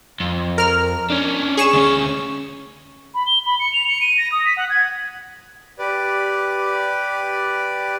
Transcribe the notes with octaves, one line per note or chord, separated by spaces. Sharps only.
F2
A#4 F6
C#4 D4
G#4 C#6 E7
D2 C#4
B5
G7
B5
C#7
F7
C#7
D#7
A#6
D#6
B6
F#5
G#6
G4 B4 D5